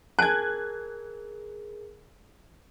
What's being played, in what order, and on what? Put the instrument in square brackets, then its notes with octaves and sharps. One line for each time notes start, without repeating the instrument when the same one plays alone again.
[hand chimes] G#4 A#4 [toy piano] G#5 A5 [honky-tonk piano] F#6 G#6